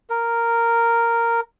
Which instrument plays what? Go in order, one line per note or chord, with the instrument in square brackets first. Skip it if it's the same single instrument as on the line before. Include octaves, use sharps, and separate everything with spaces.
[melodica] A#4